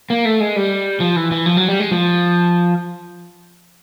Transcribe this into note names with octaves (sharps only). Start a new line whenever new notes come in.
A#3
A3
G#3
G3
F3
E3
E3
F3
F#3
G3
G#3
F3